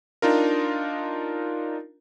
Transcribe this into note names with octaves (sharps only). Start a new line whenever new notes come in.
D4 D#4 F4 A#4